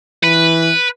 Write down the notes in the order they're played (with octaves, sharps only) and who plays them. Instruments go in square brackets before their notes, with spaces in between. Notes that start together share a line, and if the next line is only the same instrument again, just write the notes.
[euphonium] E3 [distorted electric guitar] B4